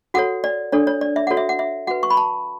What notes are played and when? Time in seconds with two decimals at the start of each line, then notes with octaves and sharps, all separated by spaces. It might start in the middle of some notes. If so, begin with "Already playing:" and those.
0.14 F#4 A4 C#5 F#5
0.44 D5
0.72 D4 A4 C#5 D5
0.87 C#5
1.01 D5
1.16 E5
1.27 F#4 A4 C#5 F#5
1.37 E5
1.49 F#5
1.59 E5
1.87 F#4 B4 F#5
2.03 C#6
2.10 B5
2.17 A5